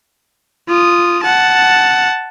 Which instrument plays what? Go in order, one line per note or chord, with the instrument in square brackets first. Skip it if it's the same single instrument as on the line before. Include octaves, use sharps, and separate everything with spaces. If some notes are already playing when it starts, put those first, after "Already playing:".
[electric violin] F4 D#6
F#5 A5